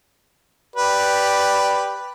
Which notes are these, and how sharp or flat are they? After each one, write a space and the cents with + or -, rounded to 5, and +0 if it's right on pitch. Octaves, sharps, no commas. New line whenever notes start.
G4 +0 B4 +0 D5 +0